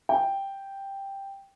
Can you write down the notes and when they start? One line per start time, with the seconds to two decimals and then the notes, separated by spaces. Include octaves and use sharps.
0.09 G5